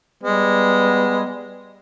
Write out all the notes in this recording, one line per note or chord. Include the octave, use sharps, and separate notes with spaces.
G3 G#3 B3